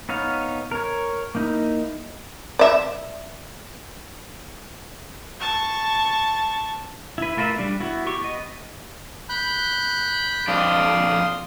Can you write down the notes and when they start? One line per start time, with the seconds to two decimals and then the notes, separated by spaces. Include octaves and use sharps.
0.09 B3 D#4 C#5 F5
0.71 A#4 C#5
1.35 A#3 D#4 E4
2.59 D5 E5
5.40 A5 C#6
7.18 E4 B4
7.37 A3 F4 A#4 B4 E5
7.58 G3 D4
7.80 B3 E4 F#4
8.07 G4 C#6
8.22 B3 D#5
9.29 B5 F#6 G6
10.48 F2 D4 F5 C6 D#6